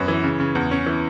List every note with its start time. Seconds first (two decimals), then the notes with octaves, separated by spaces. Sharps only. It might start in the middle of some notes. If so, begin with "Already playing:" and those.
Already playing: F#2 B3 C#5
0.08 E3
0.24 C#3
0.40 C#3
0.55 E2
0.71 C#4
0.86 E3